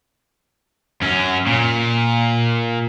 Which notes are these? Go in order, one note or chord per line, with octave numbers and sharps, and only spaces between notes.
F#2 C#4
A#2